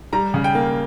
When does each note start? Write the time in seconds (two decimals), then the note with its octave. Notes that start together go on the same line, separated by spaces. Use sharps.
0.13 G3 A#5
0.34 C#3
0.44 G5
0.55 A#3